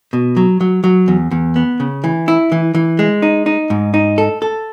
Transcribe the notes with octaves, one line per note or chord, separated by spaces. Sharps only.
B2
F#3
F#3
F#3
E2
E2
B3
C#3
E3
E4
E3
E3
G#3
D#4
D#4
G#2
D#4
A4
A4